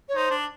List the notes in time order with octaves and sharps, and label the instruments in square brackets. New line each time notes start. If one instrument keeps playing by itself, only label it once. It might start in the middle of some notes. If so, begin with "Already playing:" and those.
[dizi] C#5
[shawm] D#4 [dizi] C5
[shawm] D4